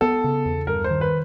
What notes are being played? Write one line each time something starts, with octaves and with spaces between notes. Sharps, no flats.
B3 A4
C#3
E2
G2 A#4
C5
D#3
B4